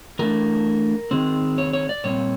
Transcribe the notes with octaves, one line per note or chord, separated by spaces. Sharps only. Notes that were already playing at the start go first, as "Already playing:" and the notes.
E3 A3 D4 A#4
D#3 G#3 C4
C#5
C#5
D5
A#2 G3 C4 C#5